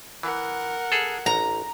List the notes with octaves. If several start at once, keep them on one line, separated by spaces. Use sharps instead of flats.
E3 A#4 F#5
G#4 A4
A1 A#5